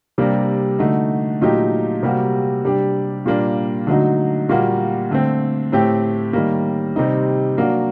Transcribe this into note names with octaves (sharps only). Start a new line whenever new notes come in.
C3 G3 A#3 D4
D3 A3 D#4 F#4
A#2 F#3 A3 D#4 G4
C3 G3 A#3 F#4
C3 G3 D4 G4
A#2 G3 A#3 D4
D3 F#3 A3 D#4 F#4
A#2 G3 A#3 F#4
D3 A3 C4
A2 A3 C4 G4
D#3 G3 A#3
C3 G3 C4 D#4
F#3 A#3 D4 F#4